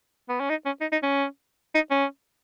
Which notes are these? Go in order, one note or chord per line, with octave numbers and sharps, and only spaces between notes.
B3
C#4
D#4
C#4
D#4
D#4
C#4
D#4
C#4